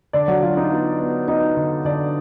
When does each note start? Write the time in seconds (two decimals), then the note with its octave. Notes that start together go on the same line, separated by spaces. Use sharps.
0.13 D3 D4 D5
0.28 F#3 F#4
0.43 F#3 F4
0.57 D#4
0.70 B3 F4
1.00 B3
1.28 B3 D#4 D#5
1.57 D3
1.85 D3 D4 D5